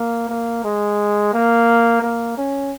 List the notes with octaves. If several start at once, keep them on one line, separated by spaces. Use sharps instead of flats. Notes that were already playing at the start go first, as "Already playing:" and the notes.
Already playing: A#3
A#3
G#3
A#3
A#3
C#4